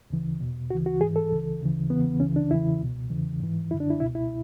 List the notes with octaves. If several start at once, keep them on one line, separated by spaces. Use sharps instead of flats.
D2 C#3 E3
E2 B2
D2 C#3 E3 F#4
F#4
G#2 E3 G#4
A4
C#2 C#3 E3
D2 C#3 E3
E2 C#3 E3 B3
C#2 C#3 E3 C#4
D4
E2 C#3 E3 E4
C#2 B2
E2 C#3 E3
G#2 E3
F#2 D3 E4
D4
E4
C#2 B2 E4
E4